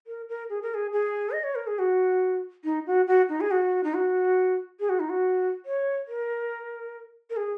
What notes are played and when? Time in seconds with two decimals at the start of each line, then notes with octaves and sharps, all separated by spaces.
0.07 A#4
0.29 A#4
0.50 G#4
0.62 A#4
0.74 G#4
0.93 G#4
1.31 D#5
1.44 C#5
1.55 A#4
1.67 G#4
1.79 F#4
2.64 D#4
2.86 F#4
3.07 F#4
3.29 D#4
3.41 G#4
3.51 F#4
3.84 D#4
3.94 F#4
4.80 G#4
4.89 F#4
5.00 D#4
5.09 F#4
5.66 C#5
6.08 A#4
7.30 A#4
7.36 G#4